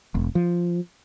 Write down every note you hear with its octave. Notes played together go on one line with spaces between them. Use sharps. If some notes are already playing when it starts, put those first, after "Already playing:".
E1
F3